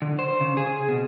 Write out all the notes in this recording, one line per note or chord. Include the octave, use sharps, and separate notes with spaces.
D3
C5
C#3
G#4
B2